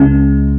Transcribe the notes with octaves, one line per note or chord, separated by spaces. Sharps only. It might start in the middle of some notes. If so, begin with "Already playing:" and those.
Already playing: C#2 C#3 G#3 C#4